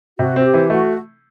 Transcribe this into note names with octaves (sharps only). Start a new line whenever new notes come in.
C3 F#4
C4 F#4
G4
E3
A3 F#4